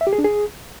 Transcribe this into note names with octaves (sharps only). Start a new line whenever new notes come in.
E5
G4
G#4
D4
G#4